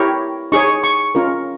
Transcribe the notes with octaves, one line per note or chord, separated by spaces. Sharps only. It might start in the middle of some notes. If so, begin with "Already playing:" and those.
Already playing: E4 G4 A#4 C#5
D#4 G#4 C#5 C#6
C#6
C#4 F4 A#4